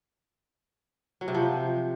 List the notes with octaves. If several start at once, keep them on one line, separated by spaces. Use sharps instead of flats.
F#3
C3
F3